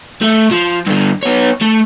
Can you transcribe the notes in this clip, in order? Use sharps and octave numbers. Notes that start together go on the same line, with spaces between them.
A3
F3
G2 D3
B3 C#5
A3